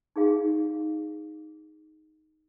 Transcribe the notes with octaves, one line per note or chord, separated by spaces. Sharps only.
D#4 G#4 F5